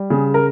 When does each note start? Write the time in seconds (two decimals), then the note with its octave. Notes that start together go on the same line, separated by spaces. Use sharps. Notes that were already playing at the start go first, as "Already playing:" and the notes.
Already playing: G3
0.10 C#3 G#4
0.34 A#4